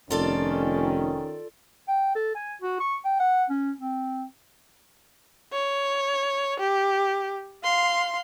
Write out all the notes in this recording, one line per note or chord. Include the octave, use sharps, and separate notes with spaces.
F1 D#3 C#4 F4 A4 D5
G5
A4
G#5
F#4
C#6
G5
F#5
C#4
C4
C#5
G4
F5 C6